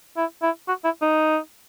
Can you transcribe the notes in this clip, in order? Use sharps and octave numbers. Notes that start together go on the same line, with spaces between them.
E4
E4
F#4
E4
D#4